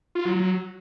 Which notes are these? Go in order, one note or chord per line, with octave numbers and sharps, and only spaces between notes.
F4
F#3
F#3